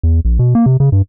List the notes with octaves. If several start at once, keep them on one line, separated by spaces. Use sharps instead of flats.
E2
A#1
B2
A#3
C3
C#3
G2